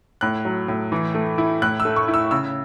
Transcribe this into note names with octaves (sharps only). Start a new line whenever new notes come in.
A2 F#6
F#3
A2
E3
A3
E4
A2 F#6
E6
A3
C#6
E4
E6
C#3 E6